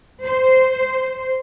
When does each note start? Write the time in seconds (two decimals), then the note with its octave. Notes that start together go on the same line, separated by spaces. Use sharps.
0.25 C5